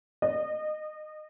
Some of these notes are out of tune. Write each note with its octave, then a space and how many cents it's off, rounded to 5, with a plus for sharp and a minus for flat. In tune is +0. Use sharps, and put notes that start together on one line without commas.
D#5 -25